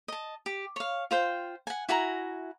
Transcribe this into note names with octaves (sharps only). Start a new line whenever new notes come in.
D#5 A5
G4
C#5 F5
F4 C5 G5
F#5 G#5
E4 F#4 G#5 A#5